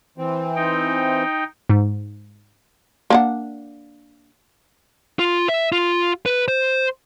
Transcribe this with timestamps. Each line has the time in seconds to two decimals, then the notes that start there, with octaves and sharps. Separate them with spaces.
0.18 E3 C4
0.56 D#4 G5
1.70 G#2
3.10 A#3 D4 F#5
5.19 F4
5.49 E5
5.72 F4
6.26 B4
6.48 C5